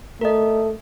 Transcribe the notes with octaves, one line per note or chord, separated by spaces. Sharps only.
A3 A#4 D#5